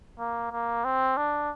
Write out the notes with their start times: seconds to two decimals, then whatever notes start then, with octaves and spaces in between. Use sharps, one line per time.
0.19 A#3
0.51 A#3
0.84 C4
1.17 D4